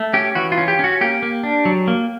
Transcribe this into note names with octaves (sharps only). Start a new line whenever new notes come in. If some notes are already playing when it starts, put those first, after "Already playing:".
Already playing: A3
C#4 G4
E3 F#4
F4
C#4
G4
C#4 F#4
A#3 G4
A#3
D4
F#3
A#3